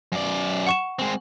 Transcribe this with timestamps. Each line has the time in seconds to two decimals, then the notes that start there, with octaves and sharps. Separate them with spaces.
0.12 F#2 D5
0.67 F#5 C#6 E7
0.99 G#3 C4